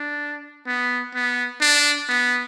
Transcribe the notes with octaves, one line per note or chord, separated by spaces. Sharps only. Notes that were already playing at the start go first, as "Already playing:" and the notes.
Already playing: D4
B3
B3
D4
B3